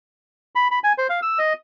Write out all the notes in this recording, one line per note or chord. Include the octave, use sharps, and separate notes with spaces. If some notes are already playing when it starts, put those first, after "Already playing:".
B5
B5
G#5
C5
F5
E6
D#5